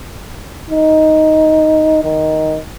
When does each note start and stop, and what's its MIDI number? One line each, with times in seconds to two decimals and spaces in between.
0.71 2.01 63
2.04 2.58 51